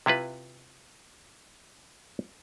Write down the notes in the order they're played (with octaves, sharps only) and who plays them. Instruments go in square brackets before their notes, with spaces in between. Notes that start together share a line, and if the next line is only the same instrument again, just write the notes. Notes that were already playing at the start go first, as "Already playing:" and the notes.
[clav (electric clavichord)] C3 E4 F4 B4